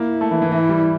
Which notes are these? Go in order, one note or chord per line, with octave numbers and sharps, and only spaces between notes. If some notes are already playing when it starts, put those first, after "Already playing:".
Already playing: A#3 E4
A3
E3
E3
E3 E4
G3